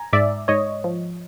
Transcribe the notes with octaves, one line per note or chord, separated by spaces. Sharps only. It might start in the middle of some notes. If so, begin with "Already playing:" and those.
Already playing: G#5 A#5
G#2 D5 E5
G#2 C#5 D#5
F3